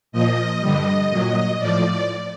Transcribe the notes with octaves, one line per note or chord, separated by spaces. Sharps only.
A#2 F3 D#5
G2 D3 G3 D#5
A#2 F#3
A2 F3 D5